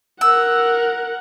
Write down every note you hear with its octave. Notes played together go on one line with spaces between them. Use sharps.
A#4 F#5 E6